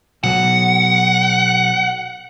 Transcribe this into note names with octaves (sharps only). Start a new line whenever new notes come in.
B2 F#3 F#5